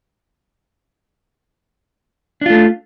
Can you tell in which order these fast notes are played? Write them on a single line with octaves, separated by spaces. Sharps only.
D4 F4 A3